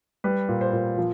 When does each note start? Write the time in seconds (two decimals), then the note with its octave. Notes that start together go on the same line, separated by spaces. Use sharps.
0.24 G3 B4
0.49 A#2
0.61 C5
0.73 A#2
0.98 F3